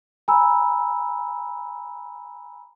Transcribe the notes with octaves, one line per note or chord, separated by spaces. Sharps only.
G#5 A#5 B5 E6